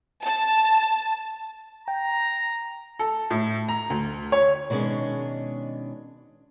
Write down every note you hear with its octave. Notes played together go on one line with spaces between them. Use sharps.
A5
G5 A#5
A4
A2
A#5
D2
C#5
B2 D#3 G#3 C#4 D4